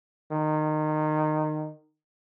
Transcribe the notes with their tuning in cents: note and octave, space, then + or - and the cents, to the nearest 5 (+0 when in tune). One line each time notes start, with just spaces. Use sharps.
D#3 -20